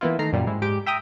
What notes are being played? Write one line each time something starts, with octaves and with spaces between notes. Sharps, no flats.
E3 A#3 B3 E4 F4
D#3 A3 A#5 C7
F#2 A#2 G3 A#3
G#2 E4
G#2 G4 D7
E5 G5 A#5 D#6